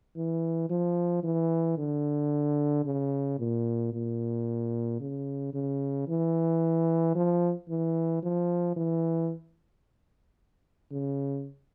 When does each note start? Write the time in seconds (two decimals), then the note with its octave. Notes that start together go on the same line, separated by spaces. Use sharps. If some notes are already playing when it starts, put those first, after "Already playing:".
0.16 E3
0.70 F3
1.23 E3
1.78 D3
2.85 C#3
3.39 A#2
3.92 A#2
5.00 C#3
5.54 C#3
6.08 E3
7.15 F3
7.69 E3
8.23 F3
8.76 E3
10.91 C#3